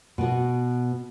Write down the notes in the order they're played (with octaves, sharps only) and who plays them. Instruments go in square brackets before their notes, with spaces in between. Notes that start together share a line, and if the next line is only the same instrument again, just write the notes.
[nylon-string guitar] B2 B3 F#4